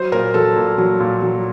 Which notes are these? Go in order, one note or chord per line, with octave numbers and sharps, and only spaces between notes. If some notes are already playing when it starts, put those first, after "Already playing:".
Already playing: F#3 C5
A#2 A#4
F#3 A4
A#2
F#3
A#2
F#3